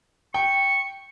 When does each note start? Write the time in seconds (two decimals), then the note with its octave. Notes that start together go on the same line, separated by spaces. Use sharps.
0.34 G5 C#6